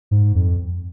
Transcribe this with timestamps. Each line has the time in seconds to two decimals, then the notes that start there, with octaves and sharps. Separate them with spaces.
0.11 G#2
0.35 F2